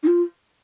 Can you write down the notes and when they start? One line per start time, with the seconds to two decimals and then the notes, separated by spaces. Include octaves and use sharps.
0.03 D#4
0.07 F4